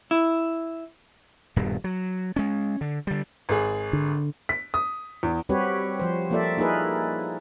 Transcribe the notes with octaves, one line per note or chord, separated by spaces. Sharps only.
E4
D#1 G2 B2
F#3
G#3 C#4
D3
D3 G3
G#1 G#4
D3
B6
D#6
E2
G3 C4 F#4 G4 B4 C#5
F3 C5
F3 A#3 F4 A4 D5 E5
A#3 D#4 E4 G#4 A#4 B4